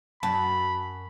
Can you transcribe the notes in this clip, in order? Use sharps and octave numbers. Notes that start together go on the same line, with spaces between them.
F#2 A5 B5